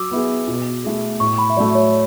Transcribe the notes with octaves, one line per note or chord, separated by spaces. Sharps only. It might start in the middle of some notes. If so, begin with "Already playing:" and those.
Already playing: F#3 D6 E6
B3 E4 G#4
B2
A3 E4 G#4
A2 C#6
B5
E5
F#3 A3 D5
C#5